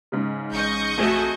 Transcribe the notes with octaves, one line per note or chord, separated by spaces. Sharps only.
G#2 C#3
A1 D#5 C#6 G6
F2 A3 F#4 G#4 E7